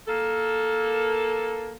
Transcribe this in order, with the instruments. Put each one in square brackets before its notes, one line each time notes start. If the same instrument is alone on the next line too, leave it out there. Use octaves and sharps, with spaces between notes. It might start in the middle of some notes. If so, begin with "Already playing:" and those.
[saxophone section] A#3 A4